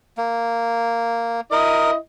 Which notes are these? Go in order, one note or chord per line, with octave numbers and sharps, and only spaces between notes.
A#3
E4 A#4 D#5